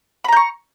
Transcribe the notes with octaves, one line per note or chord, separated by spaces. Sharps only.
A#5 B5 C#6 G6